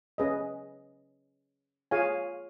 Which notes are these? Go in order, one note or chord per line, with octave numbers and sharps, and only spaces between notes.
C#4 G#4 B4 D#5
F4 G#4 C#5 F5 G#5